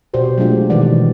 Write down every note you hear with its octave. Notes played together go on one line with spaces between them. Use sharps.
B2 F#4 G4 C5 D5
F#3 G#3 A3 D4 F4 G4
B2 D#3 E3 G4 D5 F#5